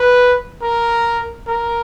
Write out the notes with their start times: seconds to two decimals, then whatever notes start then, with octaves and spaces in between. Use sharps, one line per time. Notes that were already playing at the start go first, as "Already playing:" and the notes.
Already playing: B4
0.62 A#4
1.47 A#4